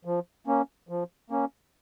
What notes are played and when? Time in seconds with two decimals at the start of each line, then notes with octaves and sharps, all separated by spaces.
0.05 F3
0.47 A#3 C#4
0.89 F3
1.30 A#3 C#4